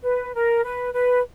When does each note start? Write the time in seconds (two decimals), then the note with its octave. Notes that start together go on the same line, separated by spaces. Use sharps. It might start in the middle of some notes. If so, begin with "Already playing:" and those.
0.03 B4
0.34 A#4
0.64 B4
0.94 B4